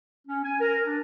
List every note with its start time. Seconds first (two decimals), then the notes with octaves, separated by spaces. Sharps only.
0.28 C#4
0.44 G#5
0.61 A#4
0.86 D4